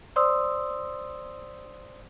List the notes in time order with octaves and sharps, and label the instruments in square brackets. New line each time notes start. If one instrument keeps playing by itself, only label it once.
[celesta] C5 D5 C6 D#6 E6